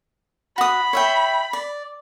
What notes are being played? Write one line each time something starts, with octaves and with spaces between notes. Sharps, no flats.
F#4 B5 D#6
C#5 E5 G5
D5